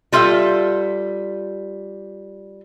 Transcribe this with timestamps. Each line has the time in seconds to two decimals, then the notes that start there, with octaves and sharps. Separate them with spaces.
0.12 G3 F4 A4 E5